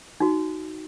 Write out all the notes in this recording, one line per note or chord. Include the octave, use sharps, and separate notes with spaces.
D#4 F#4